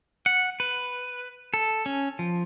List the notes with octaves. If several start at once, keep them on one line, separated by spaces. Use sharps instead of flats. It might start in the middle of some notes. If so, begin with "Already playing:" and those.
F#5
B4
A4
C#4
F3